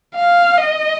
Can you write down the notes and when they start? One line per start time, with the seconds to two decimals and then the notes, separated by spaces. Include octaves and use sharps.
0.15 F5
0.57 D#5